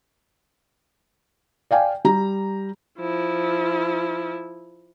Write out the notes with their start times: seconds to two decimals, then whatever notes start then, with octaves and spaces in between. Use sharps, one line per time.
1.71 D5 F5 G5 G#5
2.05 G3 A#5
2.98 F3 E4